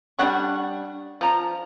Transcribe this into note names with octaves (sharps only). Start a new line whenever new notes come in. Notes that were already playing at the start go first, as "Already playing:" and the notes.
G3 D4 F#5 C#6
F3 A#5